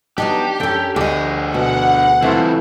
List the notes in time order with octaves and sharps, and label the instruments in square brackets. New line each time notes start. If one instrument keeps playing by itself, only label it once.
[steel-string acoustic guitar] F#3 B3 D#4 [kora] D4 [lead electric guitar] G4
[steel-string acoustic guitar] F#2 C#4 [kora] A4 G5
[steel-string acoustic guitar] D2 D#5 [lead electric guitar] D4 G#4 [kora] G4
[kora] B2 [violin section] F#5
[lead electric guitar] C#2 C4 [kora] E3 A3 F4